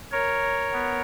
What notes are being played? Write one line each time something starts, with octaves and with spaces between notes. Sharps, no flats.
A#4 C#5
B3